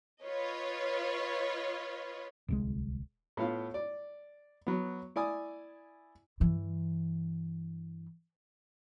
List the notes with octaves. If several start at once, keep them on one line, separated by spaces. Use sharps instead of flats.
F4 B4 C#5 D#5
D1 C2 G#3
A2 B3 F4 F5
D5
F#3 B3
E4 D5 G#5 D#6
G2 E3